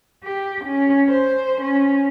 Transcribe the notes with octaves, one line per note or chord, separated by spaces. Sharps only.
G4
C#4
C5
C#4